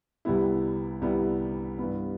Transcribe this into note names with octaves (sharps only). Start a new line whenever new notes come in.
C2 C3 G3 B3 E4
C2 C3 G3 B3 E4
G2 E3 B3